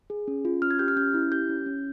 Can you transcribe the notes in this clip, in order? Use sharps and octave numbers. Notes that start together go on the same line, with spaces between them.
G#4
C#4
F4
C#4 F6
G#6
G4 G6
F6
C#4 G6
E4
G4 G6
C#4
C#4